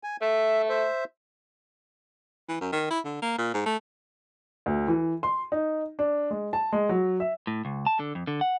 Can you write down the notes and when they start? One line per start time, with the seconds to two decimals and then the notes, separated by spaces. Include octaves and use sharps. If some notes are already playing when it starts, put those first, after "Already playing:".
0.03 G#5
0.21 A3 E5
0.69 C5 E5
2.49 E3
2.60 F#2
2.72 D#3
2.90 E4
3.05 D3
3.22 A#3
3.38 A#2
3.54 G#2
3.66 A3
4.66 D2
4.88 E3
5.23 C6
5.52 D#4
5.99 D4
6.31 G#3
6.53 A5
6.72 G#3
6.89 F#3
7.20 E5
7.47 A2
7.65 C#2
7.86 A5
8.00 D3
8.15 F2
8.27 D3
8.41 F#5